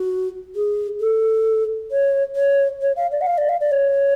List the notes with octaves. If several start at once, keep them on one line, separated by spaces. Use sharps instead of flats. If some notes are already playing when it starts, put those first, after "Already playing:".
Already playing: F#4
G#4
A4
C#5
C#5
C#5
F5
D5
F#5
F5
D5
F5
D5
C#5